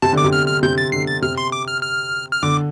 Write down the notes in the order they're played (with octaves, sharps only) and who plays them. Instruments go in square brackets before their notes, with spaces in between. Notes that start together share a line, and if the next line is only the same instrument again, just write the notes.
[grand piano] C3 [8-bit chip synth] A5
[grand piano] D3 [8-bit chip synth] D6
[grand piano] C3
[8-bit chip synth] F6
F6
[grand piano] C3 [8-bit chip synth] G6
[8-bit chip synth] A6
[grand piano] D3 [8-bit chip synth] C7
[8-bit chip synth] A6
[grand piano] C3 [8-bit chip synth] F6
[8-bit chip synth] C6
D6
F6
F6
F6
[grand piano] D3 [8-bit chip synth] D6